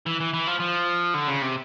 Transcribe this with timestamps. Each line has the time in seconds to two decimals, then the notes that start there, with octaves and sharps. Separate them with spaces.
0.06 E3
0.21 E3
0.34 E3
0.47 F3
0.60 F3
1.14 D3
1.28 C#3
1.42 C3